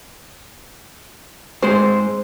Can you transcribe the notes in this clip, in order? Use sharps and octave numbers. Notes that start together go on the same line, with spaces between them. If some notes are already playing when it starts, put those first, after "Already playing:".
G#2 G#3 C4 C5